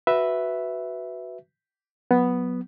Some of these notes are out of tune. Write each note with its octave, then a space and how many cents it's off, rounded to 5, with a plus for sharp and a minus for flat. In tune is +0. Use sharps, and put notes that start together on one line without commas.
F#4 +0 B4 +0 E5 +0
F#3 -15 B3 +0